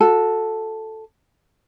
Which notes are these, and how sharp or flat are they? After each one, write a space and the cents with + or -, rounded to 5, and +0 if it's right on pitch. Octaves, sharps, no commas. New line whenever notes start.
F#4 -30 A4 +0